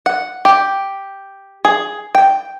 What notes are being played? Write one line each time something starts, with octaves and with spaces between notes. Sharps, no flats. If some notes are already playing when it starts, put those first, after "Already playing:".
F#5
G4
G#4
G5